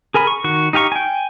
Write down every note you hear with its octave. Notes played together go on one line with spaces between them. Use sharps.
G#4 A#4 G#5 B5
C#6
D#3 F#4 C#6
D#4 G4 F5 G#5 C#6
G5 G#5